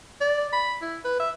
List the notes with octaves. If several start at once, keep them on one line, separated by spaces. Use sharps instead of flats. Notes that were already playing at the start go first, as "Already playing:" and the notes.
D5
B5
E4
B4
E5